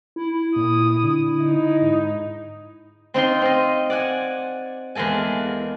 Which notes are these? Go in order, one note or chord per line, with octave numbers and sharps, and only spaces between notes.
E4
A#2 D#6
D3
D#4
G#2
C4 D#4 F4 C6
C4 D#5
D5 F#5 G#5
E2 G#3 A#3 A4 G#5